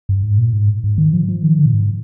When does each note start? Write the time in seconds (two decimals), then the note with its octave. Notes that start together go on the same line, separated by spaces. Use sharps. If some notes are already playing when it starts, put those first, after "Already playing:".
0.09 G2
0.23 G#2
0.38 A#2
0.53 G#2
0.84 G#2
0.98 D#3
1.13 F3
1.28 F3
1.43 D#3
1.58 D3
1.65 A#2
1.73 G#2